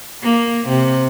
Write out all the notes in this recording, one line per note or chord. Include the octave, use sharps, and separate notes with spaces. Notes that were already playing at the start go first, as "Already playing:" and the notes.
A#3
C3